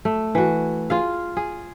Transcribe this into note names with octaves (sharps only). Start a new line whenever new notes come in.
A3
E3 F#4
F4 G#4 F5
G#4